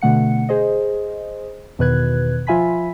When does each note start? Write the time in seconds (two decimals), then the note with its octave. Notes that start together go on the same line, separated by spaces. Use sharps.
0.02 B2 D3 A3 F#5 C#7
0.49 G#4 C5 D#5
1.79 E2 B2 D#3 B4 F#6 G#6
2.47 F3 F4 E5 G#5 B5 B6